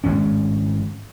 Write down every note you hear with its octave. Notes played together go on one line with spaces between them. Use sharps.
G#1 A2 C#4